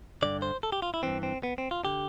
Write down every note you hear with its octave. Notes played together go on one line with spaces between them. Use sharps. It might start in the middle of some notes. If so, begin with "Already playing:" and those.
G2 D3 D5
C5
A4
G4
F4
E4
G2 E3 C4
C4
B3
C4
F4
D3 G4